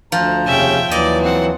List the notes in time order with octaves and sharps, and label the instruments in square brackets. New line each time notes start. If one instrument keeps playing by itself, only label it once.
[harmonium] D2 A#5 [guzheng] F3
[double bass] F1 [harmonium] D#2 C#3 C#4 [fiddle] E5 G5
[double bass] D#2 [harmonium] E3 F#3 [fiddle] D5 [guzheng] D#5
[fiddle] C4 F#5